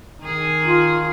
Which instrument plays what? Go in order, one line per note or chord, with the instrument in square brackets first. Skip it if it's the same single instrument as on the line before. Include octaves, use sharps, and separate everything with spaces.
[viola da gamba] D#3 G#4
[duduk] F4